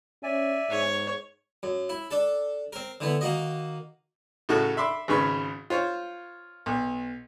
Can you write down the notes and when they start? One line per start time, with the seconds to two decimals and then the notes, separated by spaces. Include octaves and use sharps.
0.23 C#4 D5 E5 G#5
0.70 G#2 C#5
1.63 F#2
1.89 E4
2.11 D4 A4
2.73 C4 A#4
3.00 D3 E3 B3
3.21 D#3 A#3 F#4 D#5
4.49 A2 C#3 D#4 F#4 A4 F#6
4.77 E5 B5 C6 D6
5.08 G#1 G#2 C#3 B4 C#6
5.70 F4 C5 C#5
6.66 B1